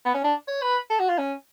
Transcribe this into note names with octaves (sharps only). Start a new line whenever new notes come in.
B3
C#4
D4
C#5
B4
A4
F#4
F4
C#4